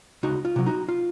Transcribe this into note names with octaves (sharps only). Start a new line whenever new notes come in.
C#2 D#4 F#4
F4
C3 F#3
D#4 F#4
F4